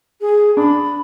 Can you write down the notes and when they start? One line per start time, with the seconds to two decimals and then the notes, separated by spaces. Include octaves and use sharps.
0.21 G#4
0.57 D4 B5